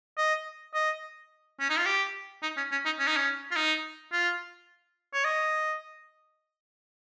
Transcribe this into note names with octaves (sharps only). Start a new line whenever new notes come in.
D#5
D#5
C#4
D#4
F4
G4
D#4
C#4
C#4
D#4
C#4
D#4
C#4
F4
D#4
F4
C#5
D#5